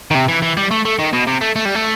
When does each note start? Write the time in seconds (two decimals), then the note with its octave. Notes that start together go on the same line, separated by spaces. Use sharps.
0.11 D#3
0.15 C3
0.28 E3
0.42 E3
0.57 G3
0.71 A3
0.85 A3
0.99 D#3
1.13 B2
1.27 C3
1.41 A3
1.56 A3
1.65 G3
1.75 A3